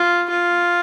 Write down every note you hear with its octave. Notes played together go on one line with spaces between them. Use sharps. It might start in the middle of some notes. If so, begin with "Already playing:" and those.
Already playing: F4
F4